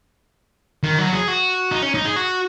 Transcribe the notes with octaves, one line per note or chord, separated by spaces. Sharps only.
D#3
F#3
G#4
F#4
D#4
C#4
D#4
G#4
F#4